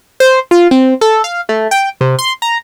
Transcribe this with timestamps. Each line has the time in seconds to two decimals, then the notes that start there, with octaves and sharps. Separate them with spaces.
0.20 C5
0.51 F4
0.71 C4
1.01 A4
1.24 F5
1.49 A3
1.71 G5
2.01 C3
2.19 C6
2.42 A#5